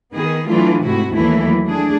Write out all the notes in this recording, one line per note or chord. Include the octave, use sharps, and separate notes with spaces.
D#3 B3 G#4
E3 F#3 A3 D4 F4
G#2 C3 A3 E4 F#4
D#2 E3 F#3 A3 A#3 E4
A3 D4 G#4